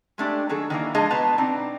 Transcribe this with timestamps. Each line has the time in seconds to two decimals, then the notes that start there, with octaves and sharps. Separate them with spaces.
0.18 G#3 A3 D4 G4
0.49 D#3 F#3 G#4 A4
0.70 D#3 E3 A#3
0.95 F3 G#3 D4 G#4 D#5
1.10 B2 B3 B4 A5 A#5
1.38 C4 D4 D#4